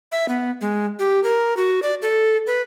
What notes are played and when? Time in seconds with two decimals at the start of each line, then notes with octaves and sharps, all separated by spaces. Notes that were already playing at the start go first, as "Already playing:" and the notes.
0.12 E5
0.28 B3
0.61 G#3
0.99 G4
1.24 A#4
1.57 F#4
1.83 D5
2.02 A4
2.47 B4